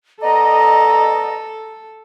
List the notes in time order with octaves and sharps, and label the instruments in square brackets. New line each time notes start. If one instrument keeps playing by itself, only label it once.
[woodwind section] B3 D5 D#5 [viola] A4 [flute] A#5